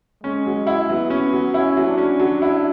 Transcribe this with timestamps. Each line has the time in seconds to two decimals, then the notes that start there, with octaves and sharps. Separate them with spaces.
0.23 G#3 C#4
0.46 F#3
0.67 E4
0.89 F#3 B3
1.10 C#4
1.33 F#3
1.54 C#4 E4
1.77 F#3
1.87 D4
1.98 C#4
2.19 F#3
2.42 E4